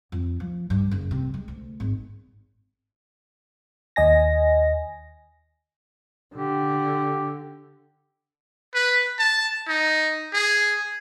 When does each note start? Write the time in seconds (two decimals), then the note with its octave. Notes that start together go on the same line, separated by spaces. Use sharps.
0.12 F2
0.40 F3
0.70 G2
0.91 F#1
1.11 C3
1.34 G#3
1.48 D2
1.80 G#1
3.96 D#2 D#5 G#5 A#6
6.35 D3 G4
8.74 B4
9.19 A5
9.68 D#4
10.33 G#4